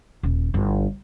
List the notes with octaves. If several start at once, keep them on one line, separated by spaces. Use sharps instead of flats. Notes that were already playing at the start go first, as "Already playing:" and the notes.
D#1
G1 E4